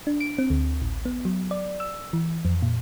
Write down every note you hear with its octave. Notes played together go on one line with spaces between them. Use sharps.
D4
D7
C4
D2
A1
B3
F#3
D5
E6
E3
F2
A#2